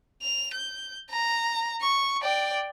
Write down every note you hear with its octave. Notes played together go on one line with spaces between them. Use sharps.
F7
G6
A#5
C#6
D5 G5